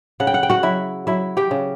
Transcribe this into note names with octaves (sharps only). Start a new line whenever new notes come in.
C#3 F#5
G5
F#5
G5
F#4 F#5
F#3 E4 E5
F#3 E4 E5
G4 G5
C#3